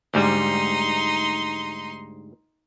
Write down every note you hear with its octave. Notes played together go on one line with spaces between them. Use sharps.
D2 G#2 G3 D#4 C6